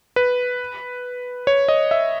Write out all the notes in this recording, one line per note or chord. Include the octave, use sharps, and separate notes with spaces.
B4
C#5
D#5
E5